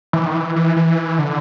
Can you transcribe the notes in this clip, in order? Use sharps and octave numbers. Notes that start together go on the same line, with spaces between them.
E3
D#3
E3
E3
E3
D3